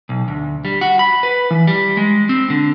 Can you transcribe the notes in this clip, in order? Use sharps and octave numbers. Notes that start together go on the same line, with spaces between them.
B1
D2
G3
F#4
B5
B4
E3
G3
G#3
C4
D3